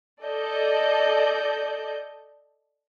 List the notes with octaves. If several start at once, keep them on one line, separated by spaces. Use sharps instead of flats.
A4 D5 D#5 G6